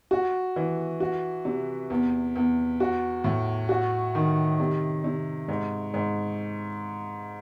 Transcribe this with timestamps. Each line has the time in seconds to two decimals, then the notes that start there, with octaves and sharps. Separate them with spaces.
0.11 F#4
0.56 E3
1.00 F#4
1.45 C3
1.90 E2
2.36 E2
2.80 F#4
3.24 A2
3.69 F#4
4.15 D#3
4.60 C3
5.04 C3
5.48 G#2
5.94 G#2